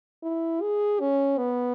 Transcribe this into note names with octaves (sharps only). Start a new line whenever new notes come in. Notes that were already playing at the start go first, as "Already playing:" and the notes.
E4
G#4
C#4
B3